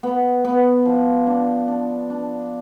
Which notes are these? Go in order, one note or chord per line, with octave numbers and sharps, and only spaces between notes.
B3
B3
F3
D4
D4
D4